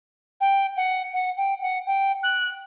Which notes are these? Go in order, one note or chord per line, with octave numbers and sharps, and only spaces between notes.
G5
F#5
F#5
G5
F#5
G5
F#6